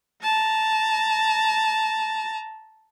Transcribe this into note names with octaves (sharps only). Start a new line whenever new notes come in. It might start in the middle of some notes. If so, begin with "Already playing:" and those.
A5 A#5